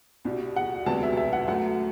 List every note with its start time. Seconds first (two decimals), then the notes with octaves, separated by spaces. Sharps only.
0.25 C2 B2 G3
0.56 F#5
0.86 E1 D2 C3 F#3 B3 A5
1.03 E5
1.17 E5
1.33 F#5
1.48 F#2 F#3 A3 F#5